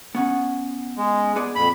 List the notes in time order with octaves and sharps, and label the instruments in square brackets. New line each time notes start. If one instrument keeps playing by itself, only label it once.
[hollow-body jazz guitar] B3 C#4 F#5
[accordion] G#3
[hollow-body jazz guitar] B3 G#4 D5
[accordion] F2 B5 [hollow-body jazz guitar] A#2